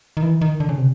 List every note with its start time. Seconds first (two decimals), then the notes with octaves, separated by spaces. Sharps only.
0.17 D#3
0.23 E3
0.41 D#3
0.60 D3
0.69 C#3
0.78 C3